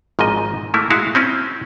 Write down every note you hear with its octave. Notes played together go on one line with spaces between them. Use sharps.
G#1 G#2 F3 D#5
A3 A#3 E4
G#3 E4 F#4 F5
C4 C#4 E4